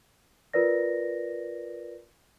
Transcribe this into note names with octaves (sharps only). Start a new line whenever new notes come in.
F4 A#4 B4 D5 A#6